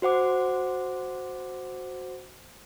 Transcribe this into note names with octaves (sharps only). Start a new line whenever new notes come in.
F#4 C5 F#5 D6